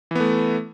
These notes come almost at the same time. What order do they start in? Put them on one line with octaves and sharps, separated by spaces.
E3 B3 A3